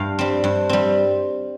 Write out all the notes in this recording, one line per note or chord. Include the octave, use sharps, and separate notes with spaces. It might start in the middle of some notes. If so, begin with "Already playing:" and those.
Already playing: G2 F5 G5
G3 C4
G2
G3 C4